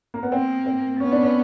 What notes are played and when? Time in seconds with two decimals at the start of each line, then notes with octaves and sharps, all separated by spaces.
0.14 A#3
0.23 B3
0.32 A#3 C4
0.66 C4
1.00 B3 C#4
1.12 D4
1.23 C#4